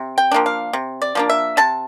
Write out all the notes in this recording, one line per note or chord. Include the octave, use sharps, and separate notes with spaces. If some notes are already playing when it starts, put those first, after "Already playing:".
Already playing: C3
G5
F3 A#3 D4
F5
C3
D5
F3 A#3 D4
E5
C3 A5